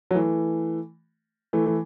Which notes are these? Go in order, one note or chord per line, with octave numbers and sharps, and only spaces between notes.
F#3
E3 A3
E3 A3
E3